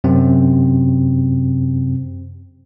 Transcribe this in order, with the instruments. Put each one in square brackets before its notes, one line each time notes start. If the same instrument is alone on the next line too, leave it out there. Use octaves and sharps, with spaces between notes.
[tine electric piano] F#2 C3 C4